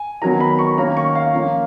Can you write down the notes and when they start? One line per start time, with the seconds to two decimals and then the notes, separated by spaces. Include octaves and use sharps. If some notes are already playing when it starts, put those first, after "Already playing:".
Already playing: G#5
0.22 D#3 F#3 B3 A#5
0.40 B5
0.59 C#6
0.78 D#3 A#3 C#4 A#5
0.97 C#6
1.15 F5
1.33 F3 A#3 C#4